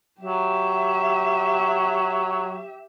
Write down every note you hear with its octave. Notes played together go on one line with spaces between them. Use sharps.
F#3 G4 E5